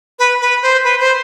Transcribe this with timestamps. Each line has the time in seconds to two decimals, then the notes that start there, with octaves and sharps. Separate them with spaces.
0.19 B4
0.41 B4
0.62 C5
0.84 B4
1.00 C5